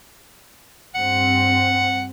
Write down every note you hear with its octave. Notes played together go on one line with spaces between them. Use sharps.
G2 C4 F#5